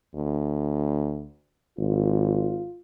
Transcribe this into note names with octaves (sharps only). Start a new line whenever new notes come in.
D2
G#1 F4